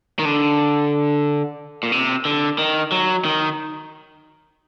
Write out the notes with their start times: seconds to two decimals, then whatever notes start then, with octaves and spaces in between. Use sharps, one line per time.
0.19 D#3
0.25 D3
1.83 A#2
1.92 C3
2.25 D3
2.58 D#3
2.92 F#3
3.25 D#3